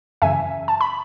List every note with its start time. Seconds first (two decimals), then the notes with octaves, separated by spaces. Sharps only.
0.22 F#2 C#3 E3 E5 G#5
0.68 A5
0.81 B5